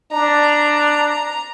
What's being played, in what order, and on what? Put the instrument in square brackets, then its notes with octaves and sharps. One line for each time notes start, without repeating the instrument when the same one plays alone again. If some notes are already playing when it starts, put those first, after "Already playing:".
[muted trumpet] D4 [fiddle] A#5